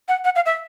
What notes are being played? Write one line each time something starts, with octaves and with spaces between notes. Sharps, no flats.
F#5
F#5
F5
E5